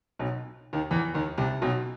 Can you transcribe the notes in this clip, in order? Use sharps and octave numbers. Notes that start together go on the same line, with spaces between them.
B1 B2
D#2 D#3
E2 E3
D#2 D#3
C2 C3
B1 B2